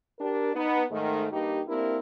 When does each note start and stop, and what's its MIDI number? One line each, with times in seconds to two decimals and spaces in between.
0.19 0.50 62
0.19 0.50 67
0.19 0.50 70
0.54 0.81 59
0.54 0.81 63
0.90 1.26 44
0.90 1.26 51
0.90 1.26 57
1.31 1.60 43
1.31 1.60 58
1.31 1.60 63
1.31 1.60 67
1.68 1.97 58
1.68 1.97 60
1.68 1.97 62
1.68 1.97 64
1.68 1.97 67
1.68 1.97 70